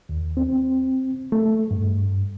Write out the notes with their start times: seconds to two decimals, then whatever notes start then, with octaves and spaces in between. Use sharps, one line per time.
0.09 D#2
0.37 C4
1.32 A3
1.71 G2